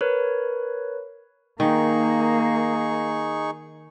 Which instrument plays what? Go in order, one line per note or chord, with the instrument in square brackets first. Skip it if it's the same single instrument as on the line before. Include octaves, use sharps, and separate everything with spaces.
[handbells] A#4 B4 C#5
[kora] D#3 [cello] A#3 [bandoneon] D#4 G#4 C#6